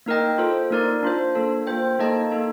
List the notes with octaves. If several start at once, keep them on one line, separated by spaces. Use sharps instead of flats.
A#3 D#4 A#4 D#5 G5
F4 A4 C5
A#3 D#4 A#4 D5
D4 F4 C5
A#3 D4 A4
A#3 F4 C5 G5
A#3 D#4 A4 D#5 A5
A#3 D#4 A4